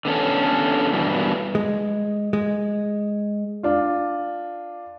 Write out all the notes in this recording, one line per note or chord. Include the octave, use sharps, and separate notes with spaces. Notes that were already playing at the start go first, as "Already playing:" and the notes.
D3 B3 C#4 A4
G2 B2 E3
G#3
G#3
D4 F4